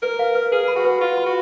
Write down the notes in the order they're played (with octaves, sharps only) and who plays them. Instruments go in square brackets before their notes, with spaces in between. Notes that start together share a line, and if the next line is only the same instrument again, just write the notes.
[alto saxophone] A#4 [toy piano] B4
[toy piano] F5
B4
[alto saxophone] G#4 [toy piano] B4
[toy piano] B5
[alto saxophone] F#4
[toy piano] B4
[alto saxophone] F4 [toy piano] B4
[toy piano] B5
[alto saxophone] F#4